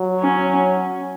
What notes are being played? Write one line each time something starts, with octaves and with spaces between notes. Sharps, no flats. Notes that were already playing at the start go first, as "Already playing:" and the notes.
Already playing: F#3
C#4